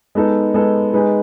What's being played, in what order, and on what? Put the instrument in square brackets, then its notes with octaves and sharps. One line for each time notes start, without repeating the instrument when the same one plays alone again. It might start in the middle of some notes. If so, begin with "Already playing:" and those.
[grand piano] G#3 B3 D#4 A4
G#3 B3 D#4 A4
G#3 D#4 G#4 B4